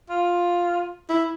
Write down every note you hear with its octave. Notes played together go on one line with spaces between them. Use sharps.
F4
E4